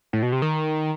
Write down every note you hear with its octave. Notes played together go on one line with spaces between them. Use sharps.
A2
B2
C3
D#3